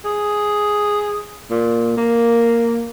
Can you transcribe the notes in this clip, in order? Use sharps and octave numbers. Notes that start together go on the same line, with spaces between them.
G#4
A#2
A#3